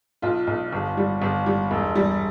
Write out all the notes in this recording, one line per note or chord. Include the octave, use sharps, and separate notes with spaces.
B1 F4
B1
G1
G3
G1
G3
E1
G3